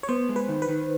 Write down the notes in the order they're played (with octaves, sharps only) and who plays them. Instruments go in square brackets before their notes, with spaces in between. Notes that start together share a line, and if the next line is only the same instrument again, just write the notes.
[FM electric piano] C#5
[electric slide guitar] B3 [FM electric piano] C5
[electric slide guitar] G#3
[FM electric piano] B4
[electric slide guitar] D#3
[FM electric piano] B4
[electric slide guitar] D#3